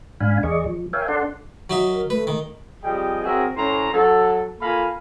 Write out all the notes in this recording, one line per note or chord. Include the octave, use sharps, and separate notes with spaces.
G#2 D4 F5 G#5 B5
E2 G#4 D5 D#5 C#6
F3
A#4 C#5 E5 F5 G5 G#5
D4 A4 D5 F#5 A5 C6
F#3 D#4 E5
A#4
A3 B4
D#3
C3 F3 G3 G#4 D#5 G5
F#3 C4 F#4 G#4 A#4 E5
A2 C#4 C5 A#5
F#3 A4
A#3 F4 A4 F5 G#5 B5